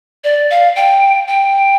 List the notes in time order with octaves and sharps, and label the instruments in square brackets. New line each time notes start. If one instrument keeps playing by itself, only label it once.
[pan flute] D5
F5
G5
G5